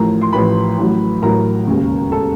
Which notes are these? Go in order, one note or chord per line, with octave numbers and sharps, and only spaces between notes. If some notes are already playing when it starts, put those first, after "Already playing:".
Already playing: A1 A2 F3 A#4 A#5
C6
A1 A2 F3 B4 B5
A1 A2 F#3
A1 A2 F#3 A#4 A#5
E1 D#2 C#3
C#3 A4 A5